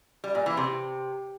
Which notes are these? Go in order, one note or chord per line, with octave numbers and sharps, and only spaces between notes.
G3
A#2
E3
C3